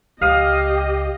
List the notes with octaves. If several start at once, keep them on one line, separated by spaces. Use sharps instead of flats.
C#2 G4 D#5 F5 D#6